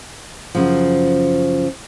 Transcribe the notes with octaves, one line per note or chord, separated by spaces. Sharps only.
F#2 C#3 F3